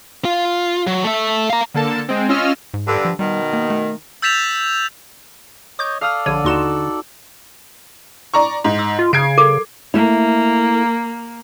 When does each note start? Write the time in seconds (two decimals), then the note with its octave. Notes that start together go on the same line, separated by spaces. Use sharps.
0.25 F4
0.87 F#3
1.04 A3 E5
1.50 F5 A#5
1.74 D3 A#3 A4 A5
2.09 G#3 C4
2.29 C#4 F4 D#5 E6 F6
2.74 G#2
2.88 G2 D3
3.05 F3
3.19 B2 D#3 G3
3.53 A#3
3.70 A3
4.22 E6 G6 A6 B6 E7 F7
5.79 C#5 D#5 D6 G6
6.01 A4 D5 F5 D#6 F6
6.26 A#1 D3 C#5 D#7
6.44 D#2 D#4 F#4 C6 E7
8.34 D5 A#5 C#6
8.64 G#2
8.79 E6
8.99 F4
9.13 C#3 G#6 C7 D7
9.38 A4 A#4 D6
9.94 A3 A#3 E4